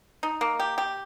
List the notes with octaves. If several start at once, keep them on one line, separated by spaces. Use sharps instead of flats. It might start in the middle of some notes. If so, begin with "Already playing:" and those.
D#4
A#3
G4
G4